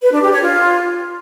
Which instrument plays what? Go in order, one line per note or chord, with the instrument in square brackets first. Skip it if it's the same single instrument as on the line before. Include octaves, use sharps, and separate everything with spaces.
[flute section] B4
D4
G4
C#5
F4